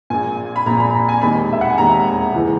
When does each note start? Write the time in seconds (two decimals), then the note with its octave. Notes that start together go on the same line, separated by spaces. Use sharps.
0.10 A#1 A#2 G#5
0.56 B5
0.66 A#1 A#2 A#5
0.80 B5
0.94 A#5
1.09 G#5
1.22 E1 D#2 D#3 B5
1.53 E5
1.61 F#5
1.70 G#5
1.78 E1 D#2 D#3 A#5
2.34 C#2 C#3 E3